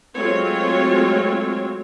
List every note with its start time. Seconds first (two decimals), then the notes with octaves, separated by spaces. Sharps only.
0.14 F#3 G#3 A3 C4 F4 C#5